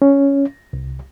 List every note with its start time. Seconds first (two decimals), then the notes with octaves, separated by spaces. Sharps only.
0.02 C#4
0.73 C2